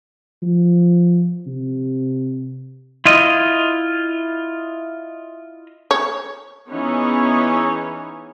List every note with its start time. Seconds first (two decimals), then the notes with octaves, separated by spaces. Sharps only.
0.43 F3
1.47 C3
3.06 E4 F4 D#5
5.91 C#5
6.68 E3 B3 C#4 D#4 G#4 C#5